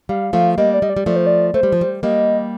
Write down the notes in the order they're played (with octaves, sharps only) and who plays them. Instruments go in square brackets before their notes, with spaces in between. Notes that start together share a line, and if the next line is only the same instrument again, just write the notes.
[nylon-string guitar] G3 [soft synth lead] F5
[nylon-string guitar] F3 A3 [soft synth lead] F5
[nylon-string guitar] G3 A#3 [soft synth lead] D#5
[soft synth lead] D5
[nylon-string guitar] G3 [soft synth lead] D#5
[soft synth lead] D5
[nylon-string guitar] G3
[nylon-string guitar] F3 A3 [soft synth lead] D5
[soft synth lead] C5
D5
[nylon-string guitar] A3 [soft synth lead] C5
[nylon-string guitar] G3
F3
G3
[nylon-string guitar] G3 A#3 [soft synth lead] D#5